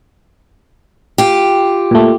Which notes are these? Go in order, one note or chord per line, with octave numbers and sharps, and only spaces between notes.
F4 G4
A#2 A3